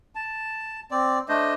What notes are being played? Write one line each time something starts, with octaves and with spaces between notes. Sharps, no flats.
A5
C4 D5
A3 D4 C5 D#5